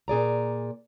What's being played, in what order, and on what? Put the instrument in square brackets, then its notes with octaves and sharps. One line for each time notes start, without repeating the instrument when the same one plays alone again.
[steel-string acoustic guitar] A#2 G#4 D5 A#5